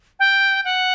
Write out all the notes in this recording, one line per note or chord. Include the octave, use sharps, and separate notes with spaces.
G5
F#5